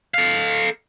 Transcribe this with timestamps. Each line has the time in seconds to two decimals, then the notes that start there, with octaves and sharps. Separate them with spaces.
0.14 A4 F5